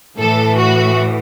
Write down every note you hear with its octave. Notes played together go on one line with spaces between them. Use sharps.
A2 E3 A4
F#4